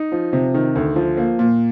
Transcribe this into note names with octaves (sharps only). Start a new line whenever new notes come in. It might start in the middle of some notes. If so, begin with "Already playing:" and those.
Already playing: D#4
F3
C3
D#3
D2
F3
A#3
A#2